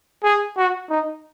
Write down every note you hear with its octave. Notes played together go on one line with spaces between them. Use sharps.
G#4
F#4
D#4